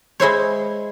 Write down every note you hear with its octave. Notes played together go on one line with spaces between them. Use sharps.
G#3 E4 C5 C#5